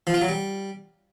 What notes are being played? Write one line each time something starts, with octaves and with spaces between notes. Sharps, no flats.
F3
F4
F#3
G3